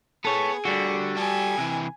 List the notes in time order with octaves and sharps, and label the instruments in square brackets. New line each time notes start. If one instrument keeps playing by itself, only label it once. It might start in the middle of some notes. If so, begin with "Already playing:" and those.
[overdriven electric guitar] B3 [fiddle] G#4 [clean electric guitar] A4 C#5
[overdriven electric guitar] D3 [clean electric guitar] G3 F#4
[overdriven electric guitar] G4 A4 [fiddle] G#5
[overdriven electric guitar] C3 E3